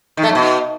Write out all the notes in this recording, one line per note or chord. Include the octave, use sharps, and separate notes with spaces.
D#3
A3
F#2
B2